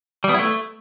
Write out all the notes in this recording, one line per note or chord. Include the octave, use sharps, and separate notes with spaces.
G3
B3
E4
A3